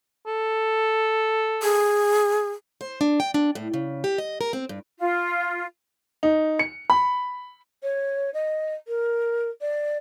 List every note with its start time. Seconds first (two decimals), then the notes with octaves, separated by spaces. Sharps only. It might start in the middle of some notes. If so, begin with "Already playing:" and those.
0.27 A4
1.62 G#4
2.81 C5
3.01 D4
3.20 G5
3.34 D4
3.55 A2
3.74 C#3
4.04 G4
4.18 D#5
4.41 A#4
4.53 C4
4.69 G2
4.98 F4
6.23 D#4
6.59 C#7
6.90 B5
7.83 C#5
8.33 D#5
8.87 A#4
9.61 D5